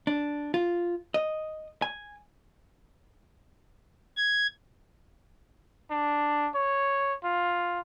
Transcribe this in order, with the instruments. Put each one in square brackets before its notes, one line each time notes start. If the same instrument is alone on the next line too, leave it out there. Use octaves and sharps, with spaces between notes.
[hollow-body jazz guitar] D4
F4
D#5
G#5
[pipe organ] G#6
[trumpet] D4
C#5
F4